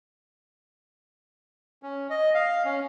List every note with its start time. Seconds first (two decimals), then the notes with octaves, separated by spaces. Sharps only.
1.83 C#4
2.10 D#5
2.35 F5
2.65 C#4